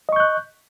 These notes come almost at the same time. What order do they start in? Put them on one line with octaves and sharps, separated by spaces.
D#5 C#6 G6 F#6